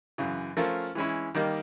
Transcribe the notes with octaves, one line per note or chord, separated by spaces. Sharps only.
F#2 C#3 E3
F3 A3 C#4 F4 A#4
E3 G#3 C#4 E4
D#3 G3 A#3 D#4